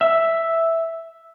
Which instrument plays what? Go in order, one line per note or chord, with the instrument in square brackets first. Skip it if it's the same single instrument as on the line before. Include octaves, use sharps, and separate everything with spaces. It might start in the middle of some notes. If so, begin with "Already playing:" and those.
[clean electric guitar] E5